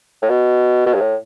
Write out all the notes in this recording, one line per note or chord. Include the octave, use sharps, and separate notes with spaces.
A2
B2
B2
G2
A2